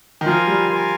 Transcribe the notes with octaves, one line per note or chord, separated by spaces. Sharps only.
D#3
F3 F4 A#4 F5 G#5
G3
F4 A#4 F5 G#5